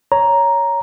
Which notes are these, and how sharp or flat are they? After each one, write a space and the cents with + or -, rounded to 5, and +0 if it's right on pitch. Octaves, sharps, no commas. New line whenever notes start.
C#5 +10 A#5 +5